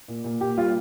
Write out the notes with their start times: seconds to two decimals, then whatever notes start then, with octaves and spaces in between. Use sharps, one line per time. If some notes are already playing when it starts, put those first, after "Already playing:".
0.08 A#2
0.24 A#2
0.41 A#2 G4
0.58 G3 F4